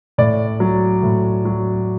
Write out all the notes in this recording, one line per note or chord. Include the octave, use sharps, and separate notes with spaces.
A2 D5
F#3
A2
F#3